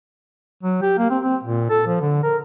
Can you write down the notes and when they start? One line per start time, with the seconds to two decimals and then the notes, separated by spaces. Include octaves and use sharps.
0.63 F#3
0.82 G4
0.98 A#3
1.10 C4
1.23 C4
1.44 A#2
1.70 A4
1.87 F3
2.01 D3
2.23 A#4